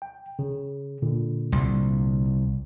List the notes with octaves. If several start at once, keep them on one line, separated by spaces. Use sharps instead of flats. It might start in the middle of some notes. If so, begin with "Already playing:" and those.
G5
C#3
A#2 D3
C2